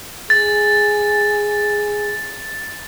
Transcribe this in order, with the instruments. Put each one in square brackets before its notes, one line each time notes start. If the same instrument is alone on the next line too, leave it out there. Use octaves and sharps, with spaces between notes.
[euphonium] G#4 [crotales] A6